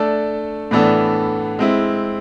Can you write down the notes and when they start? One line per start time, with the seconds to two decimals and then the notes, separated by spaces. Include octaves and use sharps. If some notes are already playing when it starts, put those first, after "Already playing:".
Already playing: A3 D4 A4 D5
0.71 A2 E3 B3 D4 A4
1.59 G#3 C4 E4